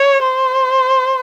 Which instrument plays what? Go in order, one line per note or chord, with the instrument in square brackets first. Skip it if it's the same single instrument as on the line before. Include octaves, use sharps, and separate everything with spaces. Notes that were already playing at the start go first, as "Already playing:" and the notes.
Already playing: [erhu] C#5
C5